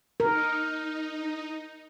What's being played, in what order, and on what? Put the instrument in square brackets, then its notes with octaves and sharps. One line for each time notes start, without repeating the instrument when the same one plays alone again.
[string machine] D#4 [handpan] A#4